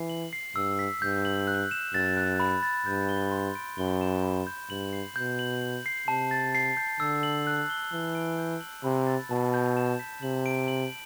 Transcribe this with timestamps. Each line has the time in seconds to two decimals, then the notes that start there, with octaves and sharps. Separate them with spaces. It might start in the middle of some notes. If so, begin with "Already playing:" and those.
Already playing: E3 C7
0.09 F#7
0.33 C7
0.56 G2 E6
0.79 B6
1.01 G2 G6
1.25 F#7
1.47 F#6
1.71 E7
1.94 F#2 A6
2.17 F#6
2.40 B5
2.63 A6
2.86 G2 G6
3.09 G7
3.31 C6
3.55 D7
3.78 F#2 G7
4.01 E7
4.24 B5
4.47 G6
4.70 G2 F#7
4.93 C7
5.16 B2 G6
5.39 F#7
5.62 F#7
5.86 C7
6.08 C3 A5
6.31 A6
6.55 C7
6.77 G6
7.00 D3 E6
7.23 F#7
7.47 F#6
7.70 G7
7.92 E3 G7
8.15 D7
8.39 G6
8.61 F#7
8.84 C3 B5
9.07 A6
9.31 B2 A5
9.54 G6
9.77 E7
9.99 B6
10.22 C3 F#7
10.46 D7
10.68 F#7